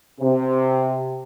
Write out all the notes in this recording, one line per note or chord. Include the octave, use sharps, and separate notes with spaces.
C3